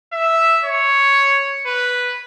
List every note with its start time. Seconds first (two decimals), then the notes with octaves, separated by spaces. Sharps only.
0.13 E5
0.64 C#5
1.66 B4